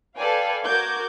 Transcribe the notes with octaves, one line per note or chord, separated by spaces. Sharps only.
A4 B4 D5 F5 G5 G#5
F#4 A#4 D6 G6 G#6